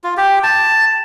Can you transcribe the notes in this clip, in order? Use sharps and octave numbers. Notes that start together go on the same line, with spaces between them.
F4
G4
A5